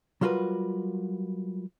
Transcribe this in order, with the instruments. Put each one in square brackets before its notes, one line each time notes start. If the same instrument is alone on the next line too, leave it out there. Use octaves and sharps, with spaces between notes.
[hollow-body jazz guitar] F#3 G3 F4 F#4 A#4 B4